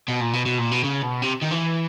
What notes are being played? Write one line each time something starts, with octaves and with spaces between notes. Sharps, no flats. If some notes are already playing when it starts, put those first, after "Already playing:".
B2
A#2
B2
B2
A#2
B2
C#3
B2
C3
D#3
E3